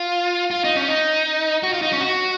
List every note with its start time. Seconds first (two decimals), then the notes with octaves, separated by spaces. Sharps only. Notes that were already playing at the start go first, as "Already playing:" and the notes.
Already playing: F4
0.51 F4
0.64 D#4
0.76 C#4
0.88 D#4
1.63 F#4
1.73 F4
1.82 D#4
1.92 C#4
2.01 F#4